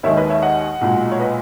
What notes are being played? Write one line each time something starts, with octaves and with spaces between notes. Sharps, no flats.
D#2 D#3 G#3 C#5 E5
B4 D#5
C#5 E5
D#5 F#5
B1 A#2 G#3
C#5
B4 D#5